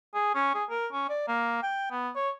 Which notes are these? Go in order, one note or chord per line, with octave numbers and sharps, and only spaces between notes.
G#4
C#4
G#4
A#4
C#4
D5
A#3
G5
B3
C#5